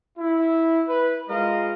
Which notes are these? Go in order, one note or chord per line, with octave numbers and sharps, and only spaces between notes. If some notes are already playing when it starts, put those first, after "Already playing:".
E4
B4
G#3 F4 A#4 D#5 F5